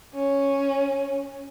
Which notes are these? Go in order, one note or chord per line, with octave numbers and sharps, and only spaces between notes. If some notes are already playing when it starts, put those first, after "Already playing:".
C#4